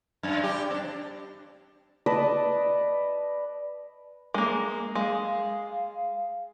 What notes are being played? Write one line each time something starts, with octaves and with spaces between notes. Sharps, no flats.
F#2
G4
C4 D4
B4 D5 D#5 A5
G#3 A#3
G#3 F5